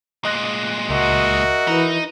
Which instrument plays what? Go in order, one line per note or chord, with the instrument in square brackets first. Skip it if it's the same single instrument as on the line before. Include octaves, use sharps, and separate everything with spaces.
[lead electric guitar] A#2 G#3 [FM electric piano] D#5 F#6 A#6
[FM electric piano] C#2 [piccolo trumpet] F#4 [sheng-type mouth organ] A#4 D#5 E5
[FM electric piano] E3 E4 B4 [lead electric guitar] D#4